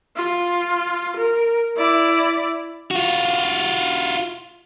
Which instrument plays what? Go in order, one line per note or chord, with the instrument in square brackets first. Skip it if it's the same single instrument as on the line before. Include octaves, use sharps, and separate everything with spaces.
[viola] F4
A#4
E4 D5
[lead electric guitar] F4 F#4